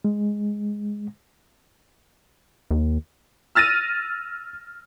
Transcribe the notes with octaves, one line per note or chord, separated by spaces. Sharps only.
G#3
D#2
E6 F6 A6 A#6 D#7